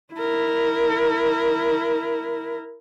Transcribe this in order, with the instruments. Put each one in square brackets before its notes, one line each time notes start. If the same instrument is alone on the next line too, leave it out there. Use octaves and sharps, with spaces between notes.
[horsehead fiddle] E4 A#4